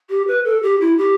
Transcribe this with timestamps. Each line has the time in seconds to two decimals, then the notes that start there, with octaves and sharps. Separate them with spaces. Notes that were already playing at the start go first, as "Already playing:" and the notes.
0.10 G4
0.27 B4
0.45 A4
0.62 G4
0.80 E4
0.97 G4